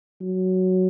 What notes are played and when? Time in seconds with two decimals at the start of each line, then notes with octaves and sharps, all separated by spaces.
0.21 F#3